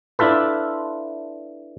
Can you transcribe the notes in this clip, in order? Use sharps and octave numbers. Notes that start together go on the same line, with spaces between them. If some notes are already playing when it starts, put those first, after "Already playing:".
D4 E4 F4 A4 B4